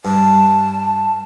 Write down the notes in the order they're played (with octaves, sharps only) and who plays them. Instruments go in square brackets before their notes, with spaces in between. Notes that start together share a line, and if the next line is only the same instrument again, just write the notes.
[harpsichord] G2 [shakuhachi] A5